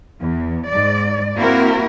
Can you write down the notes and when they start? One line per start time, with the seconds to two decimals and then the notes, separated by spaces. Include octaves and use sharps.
0.19 E2
0.68 G#2 D5
1.36 A#3 C4 E4 F#4 A#4